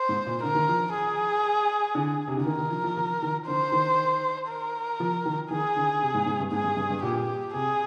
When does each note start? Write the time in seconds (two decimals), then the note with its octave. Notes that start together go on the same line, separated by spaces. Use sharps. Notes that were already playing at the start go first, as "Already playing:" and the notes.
Already playing: C5
0.09 G#2
0.26 A#2
0.43 D3 A#4
0.55 D#3
0.69 F3
0.94 G#4
1.95 D3
2.27 C3
2.37 D3
2.46 D#3 A#4
2.59 D#3
2.71 F3
2.84 F3
2.97 F3
3.22 D#3
3.47 D3 C5
3.72 D#3
4.48 A#4
5.00 F3
5.26 D#3
5.50 D#3 G#4
5.76 D3
6.02 C3
6.14 G#2
6.26 G#2
6.40 G2
6.51 G#2 G#4
6.64 G2
6.77 G2
6.90 G2
7.02 A#2 G4
7.53 C3 G#4